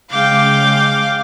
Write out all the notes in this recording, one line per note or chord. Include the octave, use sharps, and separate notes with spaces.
C#3 G#3 F5 G5 D6